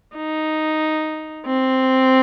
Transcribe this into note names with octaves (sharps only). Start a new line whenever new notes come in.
D#4
C4